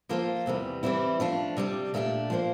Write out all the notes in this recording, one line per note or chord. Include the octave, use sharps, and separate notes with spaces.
F3 A#3 F4 A4 C5
E2 C3 E3 G3
E3 G3 C4 E4
F3 A3 D4 F4
C3 G3 D4
A#2 A3 D4 G4
F3 A#3 F4 C5